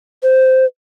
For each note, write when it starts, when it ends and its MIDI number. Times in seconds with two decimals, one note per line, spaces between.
0.23 0.65 72